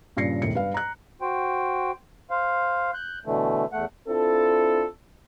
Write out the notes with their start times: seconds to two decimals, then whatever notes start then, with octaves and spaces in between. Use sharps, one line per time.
0.17 G2 A#2 C#3 A#6 C7 C#7
0.42 E1 A2 C#7
0.54 G2 B4 F5
0.74 A#5 F#6
1.21 F#4 C5 G5
2.30 C5 F5
2.94 F#6 G6
3.26 B2 D3 E3 A3
3.72 E2 A3 F#5
4.08 C4 D4 E4 F4 A4